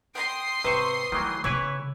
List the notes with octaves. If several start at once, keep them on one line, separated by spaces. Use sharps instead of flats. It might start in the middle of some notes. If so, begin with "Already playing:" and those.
G5 C6 D#6 C7
G#1 C3 B4 C5 C#6
D#3 E3 F#3 A3
C#3 E3 B3 E4 B4 C#5